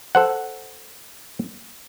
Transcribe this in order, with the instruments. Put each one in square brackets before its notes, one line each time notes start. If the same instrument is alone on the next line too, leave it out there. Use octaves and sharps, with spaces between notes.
[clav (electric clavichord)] A4 C5 F#5